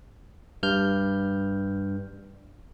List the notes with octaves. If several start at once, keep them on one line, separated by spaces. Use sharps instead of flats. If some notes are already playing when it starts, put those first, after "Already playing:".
G2 F6 G6